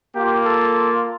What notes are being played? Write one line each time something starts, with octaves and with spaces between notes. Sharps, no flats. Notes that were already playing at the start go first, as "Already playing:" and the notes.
A#3 F4 G4
A4